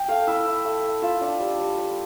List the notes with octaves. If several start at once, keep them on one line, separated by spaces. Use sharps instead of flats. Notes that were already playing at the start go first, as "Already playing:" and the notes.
Already playing: G5
A3 F5
E4 E5
E4
A3
A3
F4 E5
D4
G3
G3
G3